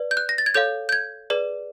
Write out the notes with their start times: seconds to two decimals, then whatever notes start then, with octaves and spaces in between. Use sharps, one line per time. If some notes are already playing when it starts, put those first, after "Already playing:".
Already playing: B4 D5
0.11 G6
0.17 F#6
0.29 A#6
0.38 A6
0.46 G#6
0.54 A4 C#5 F5 G6
0.89 G6
0.93 G#6
1.30 G#4 B4 D5